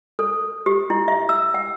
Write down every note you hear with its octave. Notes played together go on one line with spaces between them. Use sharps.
A4
G4
E4
E5
E6
F#5